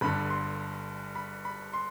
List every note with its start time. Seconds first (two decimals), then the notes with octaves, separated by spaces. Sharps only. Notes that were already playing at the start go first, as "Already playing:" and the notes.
0.01 G1 G2 D3 B5
0.30 C6
1.15 B5
1.45 B5
1.73 C6